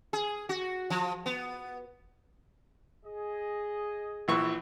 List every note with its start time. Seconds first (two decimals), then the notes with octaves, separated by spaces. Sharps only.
0.13 G#4
0.49 F#4
0.90 F3
1.26 B3
3.03 G#4 D#5
4.28 A#1 E3 C#6